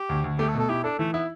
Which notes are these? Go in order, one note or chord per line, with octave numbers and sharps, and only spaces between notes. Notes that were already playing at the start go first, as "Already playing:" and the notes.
Already playing: G4
D2
D2
A3 G4
A4
B2
A4
E4 G4
D4 A4
E3 A3
B3 E4